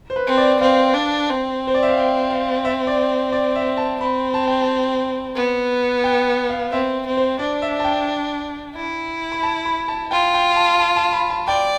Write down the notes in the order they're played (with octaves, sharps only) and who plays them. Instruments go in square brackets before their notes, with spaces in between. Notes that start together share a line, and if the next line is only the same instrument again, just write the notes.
[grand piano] C5
B4
[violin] C4
[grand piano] D5
[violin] C4 [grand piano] F5
[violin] D4
C4
[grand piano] C5
D5
E5
F5
G5
F5
E5
D5
D5
E5
A5
[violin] C4 [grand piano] B5
[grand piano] A5
G5
A5
[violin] B3
[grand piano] G5
F5
[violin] C4 [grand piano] E5
[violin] C4
[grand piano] C5
[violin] D4 [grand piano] D5
[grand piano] E5
A5
G5
[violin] E4
[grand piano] B5
A5
B5
A5
[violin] F4 [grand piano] G5
[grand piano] G5
A5
A5
A5
B5
A5
[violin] D5 [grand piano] G5